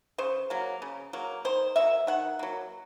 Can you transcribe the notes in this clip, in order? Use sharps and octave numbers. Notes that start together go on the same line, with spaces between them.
C#3 C5
F#3 A#3
C#3
F#3 A#3
D#3 C5
F#3 A#3 E5
D#3 F#5
F#3 A#3